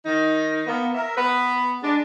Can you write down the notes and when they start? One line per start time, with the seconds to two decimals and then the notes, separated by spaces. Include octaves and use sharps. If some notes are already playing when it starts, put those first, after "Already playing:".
0.05 D#3 D#4
0.67 A#3 B3
0.95 A#4 E5
1.17 B3 B4
1.82 G#3 D4